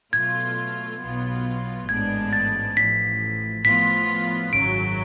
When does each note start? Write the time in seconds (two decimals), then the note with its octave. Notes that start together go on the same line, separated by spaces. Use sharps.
0.13 B2 F#3 A3 F4 G#6
1.01 B1 B2 F#3 B3 F4
1.89 A1 G#2 G#3 B3 D4 G#6
2.33 A6
2.77 A1 A2 F3 B6
3.64 A2 F3 B3 F4 B6
4.53 G#1 F#2 C#3 F#3 D7